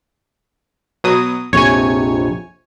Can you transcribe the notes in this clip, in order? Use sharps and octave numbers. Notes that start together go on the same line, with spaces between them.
B2 F#3 D#6
A#1 F2 C3 C#5 G#5